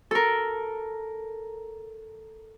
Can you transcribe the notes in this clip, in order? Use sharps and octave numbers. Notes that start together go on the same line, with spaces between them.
A4 A#4